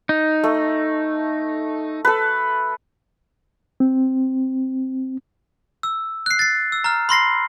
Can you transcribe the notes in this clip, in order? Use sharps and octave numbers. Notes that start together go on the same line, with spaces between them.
D#4
A3
A4 B4
C4
E6
F#6 C7
A6 C7
E6
A#5 F6
B5 C6 A#6 C7